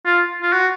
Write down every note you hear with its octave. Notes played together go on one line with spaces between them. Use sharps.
F4
F4
F#4